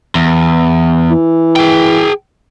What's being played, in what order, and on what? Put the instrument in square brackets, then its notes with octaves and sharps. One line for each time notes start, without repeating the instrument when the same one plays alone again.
[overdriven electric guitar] E2
[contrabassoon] E3
[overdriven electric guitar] G#4 G5